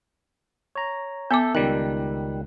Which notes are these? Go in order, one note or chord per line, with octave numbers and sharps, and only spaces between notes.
C#5 A#5
B3 A4 E5 D6 G6
C#2 D#3 G3 F#6